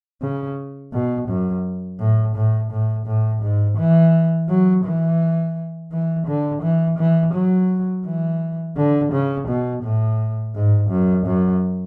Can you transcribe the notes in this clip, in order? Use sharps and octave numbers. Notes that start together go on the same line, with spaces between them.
C#3
B2
F#2
A2
A2
A2
A2
G#2
E3
F#3
E3
E3
D3
E3
E3
F#3
E3
D3
C#3
B2
A2
G#2
F#2
F#2